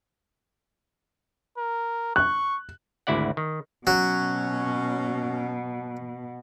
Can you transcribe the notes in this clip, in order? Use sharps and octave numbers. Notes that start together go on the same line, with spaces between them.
A#4
C#6 F#6
G#1 D2 E4 D5 F#5
D#3
B2 F#3 C#4